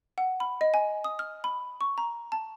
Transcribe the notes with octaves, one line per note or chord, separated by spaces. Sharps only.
F#5
B5
D#5
G#5
D#6
F6
B5
C#6
A#5
A5